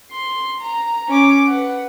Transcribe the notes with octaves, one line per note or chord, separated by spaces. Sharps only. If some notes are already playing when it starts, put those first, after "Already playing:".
C6
A#5
C#4 D6
B4 F#5